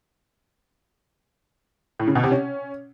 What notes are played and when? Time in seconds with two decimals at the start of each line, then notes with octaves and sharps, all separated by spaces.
2.00 A2
2.07 C#3
2.15 B2
2.23 C3
2.31 C#4